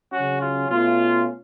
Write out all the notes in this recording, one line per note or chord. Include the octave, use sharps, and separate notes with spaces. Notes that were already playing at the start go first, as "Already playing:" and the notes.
C#3 F#3 C#4 F#4
F4
B2 A3 C#4 F4